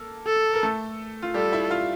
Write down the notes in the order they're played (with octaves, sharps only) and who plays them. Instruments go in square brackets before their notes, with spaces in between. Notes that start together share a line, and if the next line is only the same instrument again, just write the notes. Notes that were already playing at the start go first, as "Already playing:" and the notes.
Already playing: [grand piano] A#3 A4
[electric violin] A4
[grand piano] A#4
A3 A4
F4
[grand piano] G3 G4 [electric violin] A4
[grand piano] E4 E5
F4 F5